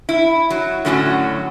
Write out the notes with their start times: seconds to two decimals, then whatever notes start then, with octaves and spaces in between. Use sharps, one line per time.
0.09 E4
0.50 F#3
0.85 A2 D3 F#3 C#4 F4 F#4